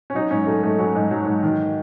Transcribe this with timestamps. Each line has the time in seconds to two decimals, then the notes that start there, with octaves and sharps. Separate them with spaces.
0.10 C#4
0.15 F#3 D#4
0.31 G#2 C#4
0.46 F#3 A3
0.63 G#2 A3
0.78 F#3 C#4
0.95 G#2
1.11 F#3
1.26 G#2
1.43 D#3